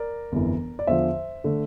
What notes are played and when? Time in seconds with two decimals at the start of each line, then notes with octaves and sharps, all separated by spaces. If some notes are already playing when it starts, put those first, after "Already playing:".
Already playing: A#4 D5
0.32 G1 F2 E3
0.79 D5
0.87 E2 D3 F3 C5 E5
1.44 D3 A3